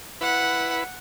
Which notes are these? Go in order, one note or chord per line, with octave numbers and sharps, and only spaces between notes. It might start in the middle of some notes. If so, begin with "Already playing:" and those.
E4 B4 F#5